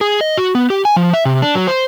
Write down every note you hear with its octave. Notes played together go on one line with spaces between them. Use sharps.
G#4
D#5
F#4
B3
G4
G#5
F3
E5
C3
D4
F#3
C5